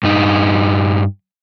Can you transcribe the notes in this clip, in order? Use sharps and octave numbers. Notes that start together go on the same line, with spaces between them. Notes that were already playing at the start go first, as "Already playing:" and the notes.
G2 D#4